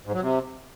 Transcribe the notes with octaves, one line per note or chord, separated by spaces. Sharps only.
G#2
F#3
C3